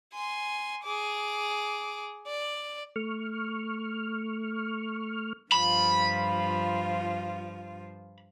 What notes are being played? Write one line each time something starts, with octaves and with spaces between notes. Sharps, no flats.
G#5 C6
G#4 D6
D5
A3 C#6 F6
G2 F3 F4 B5